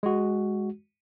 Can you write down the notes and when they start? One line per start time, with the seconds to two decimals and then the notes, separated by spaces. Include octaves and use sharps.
0.03 G#3 F#4